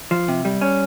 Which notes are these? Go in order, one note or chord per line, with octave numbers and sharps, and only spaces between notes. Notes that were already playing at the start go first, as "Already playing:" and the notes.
F3
C3
G3
C#4